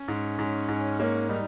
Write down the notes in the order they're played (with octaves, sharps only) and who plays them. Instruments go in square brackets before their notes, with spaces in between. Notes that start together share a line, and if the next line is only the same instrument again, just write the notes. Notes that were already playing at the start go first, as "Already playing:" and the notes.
Already playing: [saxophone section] C#4
[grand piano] G#2
G#2
G#2
[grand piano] A#3 [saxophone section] C#4
[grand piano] G3 [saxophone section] D#4